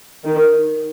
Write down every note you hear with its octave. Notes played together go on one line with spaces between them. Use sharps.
D#3